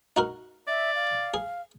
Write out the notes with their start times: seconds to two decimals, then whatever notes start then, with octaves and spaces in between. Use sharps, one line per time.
0.17 D#4 F#4 A#4
0.68 D5 E5
0.95 F5
1.34 G#4